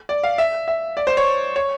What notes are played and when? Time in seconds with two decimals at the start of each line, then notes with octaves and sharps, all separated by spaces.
0.09 D5
0.23 F5
0.38 E5
0.68 E5
0.97 D5
1.07 C5
1.17 C#5
1.56 C#5